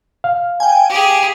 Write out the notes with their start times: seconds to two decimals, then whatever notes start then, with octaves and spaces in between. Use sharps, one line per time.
0.24 F5
0.60 G5 G#5
0.89 G4 G#4